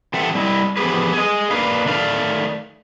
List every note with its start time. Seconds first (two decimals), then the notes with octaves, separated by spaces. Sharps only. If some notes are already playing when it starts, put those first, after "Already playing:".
0.14 E3 C4 G4 A4 E5 F#5
0.35 G3 E4 D#5
0.77 E3 F3 B3 G4 G#4 B4
1.13 G#4 D#5
1.51 A#3 D4 B4 F5
1.86 D#3 A3 D5 F5